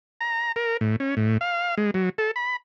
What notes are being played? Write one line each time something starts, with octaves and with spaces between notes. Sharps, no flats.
A#5
A#4
A2
C#4
A2
F5
G#3
F#3
A4
B5